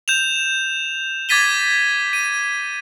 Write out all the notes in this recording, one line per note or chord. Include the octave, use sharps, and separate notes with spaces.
G6 E7 F7
D6 G#6 A6 B6 D#7 G7
D#7